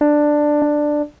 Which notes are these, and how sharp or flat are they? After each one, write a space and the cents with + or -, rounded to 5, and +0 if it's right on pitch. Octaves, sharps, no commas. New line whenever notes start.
D4 +10
D4 +10